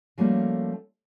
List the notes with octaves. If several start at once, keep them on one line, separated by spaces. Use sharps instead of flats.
F3 G3 A3 A#3 C#4 F#4